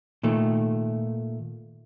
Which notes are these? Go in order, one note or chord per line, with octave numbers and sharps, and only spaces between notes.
A#2 D#3 A3